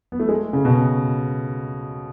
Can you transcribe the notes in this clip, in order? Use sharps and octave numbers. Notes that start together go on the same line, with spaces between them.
B3
A3
G#3
C#3
B2